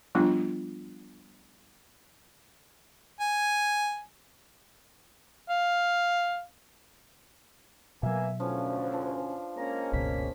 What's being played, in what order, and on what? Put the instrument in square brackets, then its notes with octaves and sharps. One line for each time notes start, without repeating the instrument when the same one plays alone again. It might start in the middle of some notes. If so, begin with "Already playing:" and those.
[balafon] F3 G3 A3 B3 D4 F4
[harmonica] G#5
F5
[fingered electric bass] B2 F#3 [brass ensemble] A#3 B3 G#5 [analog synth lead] E5
[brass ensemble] F#1 D2 [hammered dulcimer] F3 B4 F5 [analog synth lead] C#4
[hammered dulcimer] F3 D4 C5
[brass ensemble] G#3 A#3 C#4 [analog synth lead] A#5
[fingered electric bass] F#1 C#2 B2 [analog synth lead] B6